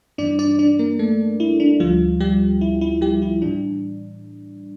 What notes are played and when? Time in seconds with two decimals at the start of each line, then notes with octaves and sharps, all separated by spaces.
0.18 G2 E3 G3 D4 D5
0.39 D4 D5
0.59 D4 D5
0.79 A#3 A#4
0.99 A3 A4
1.40 E4
1.60 D4
1.80 D2 D3 F3 G3 F4
2.20 G3 G4
2.61 E4
2.81 E4
3.01 G3 G4
3.22 E4
3.42 A2 E3 G3 D4